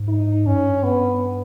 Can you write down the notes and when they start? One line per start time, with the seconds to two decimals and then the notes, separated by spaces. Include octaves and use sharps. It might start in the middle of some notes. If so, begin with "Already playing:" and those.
Already playing: G#2
0.08 D#4
0.46 G2 C#4
0.84 B3